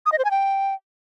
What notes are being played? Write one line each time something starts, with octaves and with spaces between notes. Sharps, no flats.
D#6
D#5
C5
G#5
G5